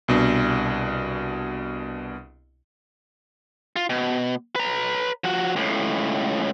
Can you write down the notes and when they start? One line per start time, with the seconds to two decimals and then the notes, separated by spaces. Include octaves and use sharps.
0.08 C2 B2 D4
3.76 F4
3.90 B2
4.56 B4 A#5
5.24 F3 F#4
5.56 C#2 A2